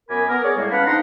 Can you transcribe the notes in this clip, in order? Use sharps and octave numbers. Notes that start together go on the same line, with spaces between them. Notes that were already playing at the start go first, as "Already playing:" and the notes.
F#2 B3 A#4 G#5 B5 D6
B3 A#4
G#4 C#5 D5
A2 G3 G#3 A#3
B3 C#4 F5 F#5 A5 B5
F2 D4 D#4 G5 A#5 C6